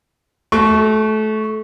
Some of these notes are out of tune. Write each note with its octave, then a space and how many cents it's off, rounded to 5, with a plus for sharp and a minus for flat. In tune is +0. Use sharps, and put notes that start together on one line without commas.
A3 -25 F#4 +0 C#6 +0